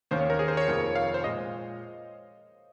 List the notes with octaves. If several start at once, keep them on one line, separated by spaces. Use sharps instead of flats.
D#2 D#3 A#3 C#4 C5
C#5
A#4
G#4
C5
C#5
F1 F2 D#3 A#3 F4
F5
C5
A#2 G#3 D#5